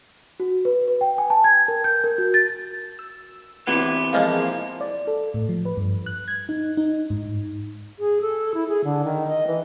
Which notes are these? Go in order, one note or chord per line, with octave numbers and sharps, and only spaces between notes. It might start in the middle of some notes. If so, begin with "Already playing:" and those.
F#4
B4
B4
G5
G#5
A5
G#6
A#4
G6
A#4
F#4
A6
E6
C3 E3 B3
F3 G#3 A#3
D5
A4
A2
F3
B4
G2
F#6
G#6
D#4
D#4
G#2
G#4
A4
E4
G#4
D3
D#3
D#5
E3